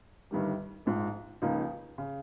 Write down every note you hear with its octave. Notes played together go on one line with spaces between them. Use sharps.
G1 G2 D#3 G3
A#1 G#2 F3
C#2 C#3 F3 A#3 D#4
C#3